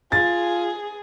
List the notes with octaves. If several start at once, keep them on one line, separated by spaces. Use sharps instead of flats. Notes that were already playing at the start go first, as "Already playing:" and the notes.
F4 G#4 A6